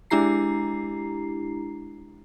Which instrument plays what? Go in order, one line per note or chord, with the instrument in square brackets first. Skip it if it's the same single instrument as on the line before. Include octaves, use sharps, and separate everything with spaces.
[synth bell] G#3 D4 E4 G4 A#5 C7